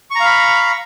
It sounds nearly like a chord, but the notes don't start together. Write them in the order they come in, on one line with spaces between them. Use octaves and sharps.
C#6 A#5 F5 B5